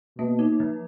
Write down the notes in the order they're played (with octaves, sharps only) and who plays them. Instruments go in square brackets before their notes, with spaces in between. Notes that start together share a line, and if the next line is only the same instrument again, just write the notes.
[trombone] B2 [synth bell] A#3
[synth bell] D#4
F3